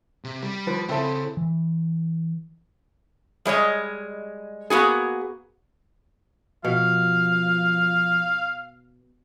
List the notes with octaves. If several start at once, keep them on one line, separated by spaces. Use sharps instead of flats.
C3
G3
F3 B4
C#3 C4 E4 A4 B5
E3
G3 G#3 C#5 D#5
A#3 B3 F#4 G#4
B2 F3 F5